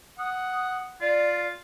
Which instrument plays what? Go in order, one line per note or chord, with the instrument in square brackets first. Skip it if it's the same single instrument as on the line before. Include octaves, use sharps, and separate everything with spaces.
[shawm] F#5 [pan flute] D#6
[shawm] F4 [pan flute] D5